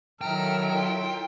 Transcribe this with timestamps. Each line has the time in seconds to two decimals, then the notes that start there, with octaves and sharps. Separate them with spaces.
0.21 D#3 F#3 E4 A4 G5 A#5 F6
0.76 F4